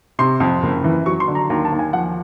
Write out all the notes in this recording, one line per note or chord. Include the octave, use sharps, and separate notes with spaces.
C3 C6
F2
F#1
E3
F#3 C#6
C6
D3
A#5
D#2 A#5
A5
D#2
G#5
F3 F#5